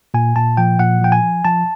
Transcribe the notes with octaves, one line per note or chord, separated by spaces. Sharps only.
A#2 G#5
A#2 A5
F3 G5
A#2 F#5
F3 G5
G#5
F3
F3 A5